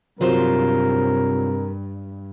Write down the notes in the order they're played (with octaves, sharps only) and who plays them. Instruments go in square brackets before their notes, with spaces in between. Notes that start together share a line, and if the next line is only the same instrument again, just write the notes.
[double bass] G2 [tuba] C3 [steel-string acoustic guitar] F#3 F4 C5 [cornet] A#4